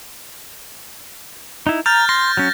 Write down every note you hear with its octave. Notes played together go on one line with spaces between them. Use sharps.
D#4 E4
A#5 F6 G6 A6
C6 A#6
F#3 C#4